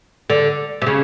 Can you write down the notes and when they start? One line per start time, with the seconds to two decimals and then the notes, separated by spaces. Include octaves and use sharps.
0.30 D3
0.82 C3
0.87 C#3